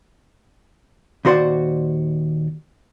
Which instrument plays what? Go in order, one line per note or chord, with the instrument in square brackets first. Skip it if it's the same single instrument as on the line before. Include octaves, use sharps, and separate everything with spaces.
[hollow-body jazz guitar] D#2 A#2 F#4 C5 D5 F#5